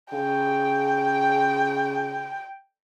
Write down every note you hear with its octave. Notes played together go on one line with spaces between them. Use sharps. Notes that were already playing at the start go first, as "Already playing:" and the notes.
C#3 G5